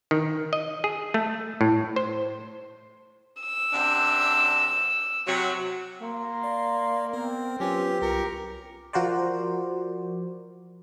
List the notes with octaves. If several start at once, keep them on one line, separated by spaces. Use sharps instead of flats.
D#3
D#5
G#4
A3
A2
C5
E6
F#2 C3 D4
C3 F#3
A#3 A#5 C6
D5 F5
B3 C4 A#4
F#3 C#4 F4 G4 B4
C2 F4 A#4 C#7
F3 F#4 A#4 C5 D5